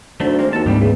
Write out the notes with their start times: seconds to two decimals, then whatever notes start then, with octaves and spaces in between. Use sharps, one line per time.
0.20 D2 D#3 F#3 A3 C5
0.39 G#3 A#3 C4 C5
0.53 D#2 F#4 A4 A5
0.66 D2 G#2 G3 G#3 C4 D4 G4
0.80 E2 C#3 A3 G#4